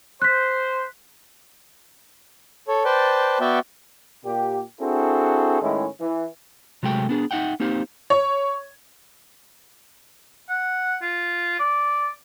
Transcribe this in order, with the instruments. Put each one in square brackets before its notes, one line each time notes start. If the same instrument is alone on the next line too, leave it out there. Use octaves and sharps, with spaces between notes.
[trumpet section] C5 [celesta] F#6 B6
[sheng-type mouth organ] A4 C#5
B4 C5 D5 G5 A5
B3 F#4 D5 E5 G5
[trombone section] A#2 G4
C4 D4 E4 F#4 G#4 A4
A2 D#3 G#3 C#4 E4 G#4
E3
[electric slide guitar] C3 F#3 G#3 A3 G5
B3 D4 G#4
D#4 E5 F#5 G5
A#3 C4 D#4 G4 C5 F5
[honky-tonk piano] C#5
[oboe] F#5
F4
D5